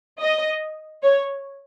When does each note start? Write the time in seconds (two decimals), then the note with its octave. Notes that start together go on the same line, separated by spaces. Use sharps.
0.20 D#5
1.03 C#5